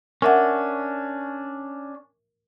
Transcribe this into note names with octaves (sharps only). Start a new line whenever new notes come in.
C#4 D4 A#4 E5 F#5